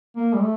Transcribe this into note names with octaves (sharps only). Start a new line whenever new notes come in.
A#3
G3
A3